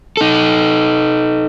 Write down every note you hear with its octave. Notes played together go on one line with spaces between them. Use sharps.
D#4 A4